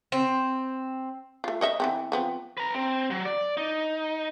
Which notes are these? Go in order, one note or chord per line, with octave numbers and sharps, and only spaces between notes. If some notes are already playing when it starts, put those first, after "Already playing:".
C4
A3 F4
C#5 D#5 E5
E3 B3 C4
F3 B3 C4
B4 A#5
C4
F#3
D5
D#4